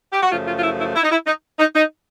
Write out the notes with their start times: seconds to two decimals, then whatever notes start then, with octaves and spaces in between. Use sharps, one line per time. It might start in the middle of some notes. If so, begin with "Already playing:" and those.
0.12 G4
0.23 F#4
0.32 F#2 C#3 F3 A3 F4
0.47 F4
0.58 F4
0.63 E4
0.79 E4
0.96 E4
1.03 D#4
1.11 E4
1.26 D#4
1.59 D#4
1.75 D#4